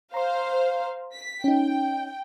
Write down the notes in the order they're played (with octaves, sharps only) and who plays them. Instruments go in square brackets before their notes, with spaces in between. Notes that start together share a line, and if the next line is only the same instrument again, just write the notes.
[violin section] C5 F5 [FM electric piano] A#5 C6
[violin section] B6
[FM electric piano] C#4 D#4 [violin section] G5